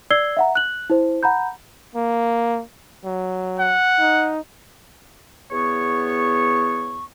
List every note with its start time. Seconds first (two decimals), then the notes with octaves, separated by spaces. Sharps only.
0.11 D5 E6 G#6 C7 G7
0.37 E5 F#5 A#5
0.55 F#6 F#7
0.90 E4 C5
1.23 F#5 A#5 B5 G6
1.95 A#3
3.05 F#3
3.60 F#5
4.00 D#4
5.50 E2 B3 C#5 C#6